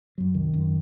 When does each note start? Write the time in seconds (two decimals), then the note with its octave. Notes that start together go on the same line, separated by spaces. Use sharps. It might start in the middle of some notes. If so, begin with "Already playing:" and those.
0.18 F#2 F#3
0.34 C2 D#3
0.54 F#2